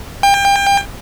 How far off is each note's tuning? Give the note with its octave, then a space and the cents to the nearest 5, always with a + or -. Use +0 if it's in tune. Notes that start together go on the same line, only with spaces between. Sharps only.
G5 +30